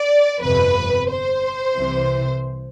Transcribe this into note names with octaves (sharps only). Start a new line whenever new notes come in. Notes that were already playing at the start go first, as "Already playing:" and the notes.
Already playing: D5
G1 F2 C3 B4
C5
C2 C3 E3